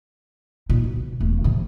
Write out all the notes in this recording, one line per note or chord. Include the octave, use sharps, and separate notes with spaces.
A#2 D#4
B2
E1 A3
C3 F3